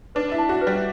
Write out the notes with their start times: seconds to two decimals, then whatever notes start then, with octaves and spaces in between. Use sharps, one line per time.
0.15 D4 B4
0.32 E4
0.38 A5
0.49 F#4
0.61 B4
0.67 G3